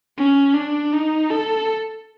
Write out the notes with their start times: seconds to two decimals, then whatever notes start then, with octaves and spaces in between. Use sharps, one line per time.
0.18 C#4
0.54 D4
0.93 D#4
1.30 A4